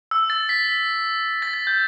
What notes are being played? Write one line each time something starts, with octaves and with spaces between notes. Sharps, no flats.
E6
A6
B6
A6
A6
G6